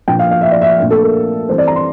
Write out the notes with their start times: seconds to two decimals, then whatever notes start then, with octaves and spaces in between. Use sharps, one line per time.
0.08 A#2 F3 A#3 D4 G5
0.19 F5
0.31 F5
0.41 E5
0.51 D5
0.61 E5
0.79 A#2 A3 D4
0.90 A4
1.02 A#4
1.49 E3 G3 C4 C5
1.58 D5
1.68 A#5
1.76 C6